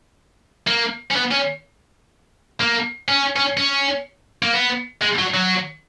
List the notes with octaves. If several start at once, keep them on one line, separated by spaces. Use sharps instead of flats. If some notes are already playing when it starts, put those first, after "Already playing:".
A#3
C#4
B3
C#4
A#3
C#4
C#4
C#4
A#3
B3
G#3
F#3
F#3